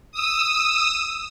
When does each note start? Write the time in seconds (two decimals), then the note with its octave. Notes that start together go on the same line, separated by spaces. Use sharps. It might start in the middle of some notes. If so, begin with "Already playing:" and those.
0.12 D#6 E6